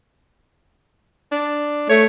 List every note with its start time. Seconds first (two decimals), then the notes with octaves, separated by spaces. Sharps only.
1.32 D4
1.89 A3 C#5